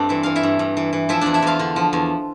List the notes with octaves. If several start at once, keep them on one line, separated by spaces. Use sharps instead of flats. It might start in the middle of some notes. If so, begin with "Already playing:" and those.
Already playing: G2 A3 C4 D4 A4 C5 D5
E3 E5
E3 F5
E4 E5
G2
G2
E3
E3
F3 E4 E5
E2 D4 D5
E4 E5
E2 F4 F5
D3
F3
E2